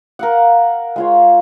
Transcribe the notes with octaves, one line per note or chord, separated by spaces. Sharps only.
A#4 F5 F#5
G#3 F4 C#5